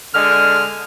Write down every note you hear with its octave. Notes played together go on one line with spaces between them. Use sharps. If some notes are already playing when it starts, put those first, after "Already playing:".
D3 G#3 F6